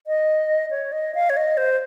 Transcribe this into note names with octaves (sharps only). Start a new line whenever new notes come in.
D#5
C#5
D#5
F5
C#5
D#5
C5